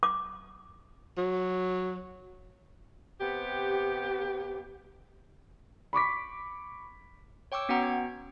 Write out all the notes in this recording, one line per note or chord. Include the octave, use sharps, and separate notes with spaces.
D6
F#3
C3 B3 G4
B5 C#6 D6 B6
C#5 G5 C#6 D6 E6
B3 C#4 F#4 F#5 G5 A#5
G#6